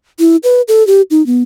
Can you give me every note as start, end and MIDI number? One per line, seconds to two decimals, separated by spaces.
0.19 0.36 64
0.43 0.62 71
0.68 0.86 69
0.87 1.02 67
1.11 1.25 63
1.26 1.43 59